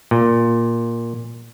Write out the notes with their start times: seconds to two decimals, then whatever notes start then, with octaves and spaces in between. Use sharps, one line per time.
0.11 A#2